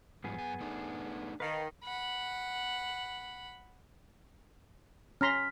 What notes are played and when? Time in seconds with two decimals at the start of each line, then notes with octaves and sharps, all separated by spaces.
0.24 G#2 F3 G3 B3 G#4
0.37 F#2 G#5
0.60 A3 D4 D#4
1.40 D#3 B4 F5 A5
1.84 F#5 B5
5.21 C#4 A#5 C6 F6 B6